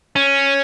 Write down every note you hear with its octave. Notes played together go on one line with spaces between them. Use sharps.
C#4